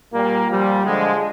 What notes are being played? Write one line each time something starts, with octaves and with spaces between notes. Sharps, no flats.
A#2 G3 A#3
A#2 F3 G3
D3 F3 G#3